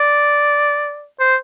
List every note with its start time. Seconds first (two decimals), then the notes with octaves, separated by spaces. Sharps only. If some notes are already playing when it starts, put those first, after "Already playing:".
Already playing: D5
1.20 C5